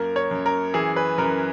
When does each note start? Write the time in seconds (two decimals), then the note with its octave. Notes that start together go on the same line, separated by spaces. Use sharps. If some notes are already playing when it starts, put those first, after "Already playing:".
Already playing: F#2 A#3 A#4
0.16 C#5
0.31 F#2
0.46 A#4
0.74 E3 G#4
0.96 B4
1.18 F#2 A#4